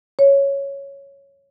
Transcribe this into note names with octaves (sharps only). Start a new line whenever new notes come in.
C#5